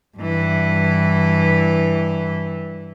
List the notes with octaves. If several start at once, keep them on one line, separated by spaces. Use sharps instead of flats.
G2 E3